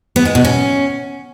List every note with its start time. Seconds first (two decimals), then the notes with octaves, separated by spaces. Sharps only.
0.16 B3
0.25 G#3
0.35 B2
0.45 C#4